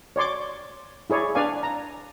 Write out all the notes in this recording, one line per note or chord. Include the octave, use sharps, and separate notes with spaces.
C#5 D5 C6 D6
E4 G#4 C#5 D5
D4 B4 D5 F5 G#5
A#5